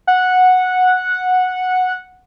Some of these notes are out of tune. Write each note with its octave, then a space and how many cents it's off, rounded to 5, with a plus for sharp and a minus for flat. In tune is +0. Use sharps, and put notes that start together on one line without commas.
F#5 -10